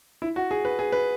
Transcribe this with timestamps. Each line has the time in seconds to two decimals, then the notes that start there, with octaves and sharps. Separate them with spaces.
0.22 E4
0.36 F#4
0.51 G#4
0.65 B4
0.79 G#4
0.92 B4